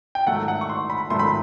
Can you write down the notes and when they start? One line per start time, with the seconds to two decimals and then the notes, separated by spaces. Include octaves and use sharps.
0.15 G5
0.27 G#2 D#3 F#3 A3 F#5
0.48 F#5
0.61 C#6
0.69 C6
0.90 B5
1.10 G#2 D#3 F#3 A3 C6
1.19 B5